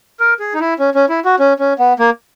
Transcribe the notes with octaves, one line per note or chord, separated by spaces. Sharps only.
A#4
G#4
D#4
E4
C#4
C#4
E4
F#4
C#4
C#4
B3
A#3